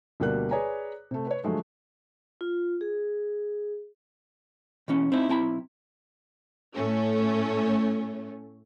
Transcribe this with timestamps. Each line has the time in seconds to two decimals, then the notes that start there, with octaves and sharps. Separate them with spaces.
0.20 D2 B2 G3 A#3 A#4 F#6
0.51 G#4 B4 C#5 D5 G#5 A#5
1.11 C3 A3
1.27 B4 C#5
1.44 D3 F3 F#3 G#3 A3
2.41 F4
2.81 G#4
4.88 B2 E3 C#4
5.12 C4 D#4 E4
5.28 B1 C4 E4 G#5 B5
6.74 A2 A3 C#4